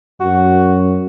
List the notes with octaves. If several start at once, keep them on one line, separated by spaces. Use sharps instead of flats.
F#2 F#4